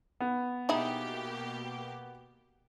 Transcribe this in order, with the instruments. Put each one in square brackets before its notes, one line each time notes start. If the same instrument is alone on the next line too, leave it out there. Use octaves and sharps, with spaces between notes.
[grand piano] B3
[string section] B2 A#3 G4 [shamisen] D#4 E4 G#4